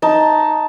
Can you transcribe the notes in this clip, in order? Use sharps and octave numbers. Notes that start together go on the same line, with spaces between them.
D#4 A5